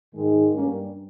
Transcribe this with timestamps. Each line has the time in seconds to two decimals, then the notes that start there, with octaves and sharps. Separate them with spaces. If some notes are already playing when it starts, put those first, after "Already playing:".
0.15 G#2 D#3 G#3
0.54 G2 G3 A#3 C#4